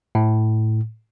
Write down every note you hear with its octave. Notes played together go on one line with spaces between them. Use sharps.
A2